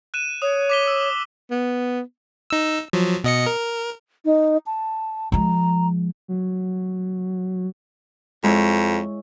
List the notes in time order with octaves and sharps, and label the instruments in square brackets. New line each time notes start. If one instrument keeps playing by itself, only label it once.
[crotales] F#6 D#7 E7
[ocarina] C#5 [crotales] D#6
[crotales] D6 B6 G7
E6
[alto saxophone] B3
[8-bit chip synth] D#4 E6
F3 F#3
B2 D#5 C#7
A#4
[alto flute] D#4
A5
[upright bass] F3 G#3 [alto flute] A#5
[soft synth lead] F#3
[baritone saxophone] F2 [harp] G#3 E4 C#5